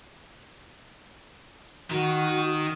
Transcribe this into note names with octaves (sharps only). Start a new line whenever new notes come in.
D#3 D#4 F#4